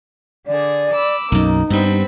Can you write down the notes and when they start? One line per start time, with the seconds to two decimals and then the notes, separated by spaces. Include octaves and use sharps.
0.47 D3 G#4 D5
0.94 B5 D6 E6
1.32 B1 F#2 A#3 D#4
1.70 G2 G3 B3 C4 B5